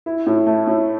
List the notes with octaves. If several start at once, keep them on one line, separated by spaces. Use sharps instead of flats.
E4
A2
A3
A2